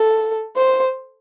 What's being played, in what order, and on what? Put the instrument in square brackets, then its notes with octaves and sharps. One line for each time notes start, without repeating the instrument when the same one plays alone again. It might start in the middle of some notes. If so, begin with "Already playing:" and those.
Already playing: [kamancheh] A4
C5